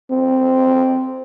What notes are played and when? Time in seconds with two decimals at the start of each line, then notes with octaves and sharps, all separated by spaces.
0.11 C4